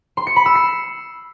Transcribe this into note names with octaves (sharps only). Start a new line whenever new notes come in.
C6
C#7
B5
E6
C7